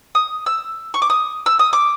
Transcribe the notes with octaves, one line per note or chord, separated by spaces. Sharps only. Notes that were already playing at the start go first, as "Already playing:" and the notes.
D#6
E6
C#6
D6
D#6
E6
D#6
D6